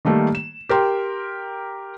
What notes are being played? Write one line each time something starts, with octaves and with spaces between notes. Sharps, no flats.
D#3 G3 A3 A#3
E7
G4 A#4 G5 C6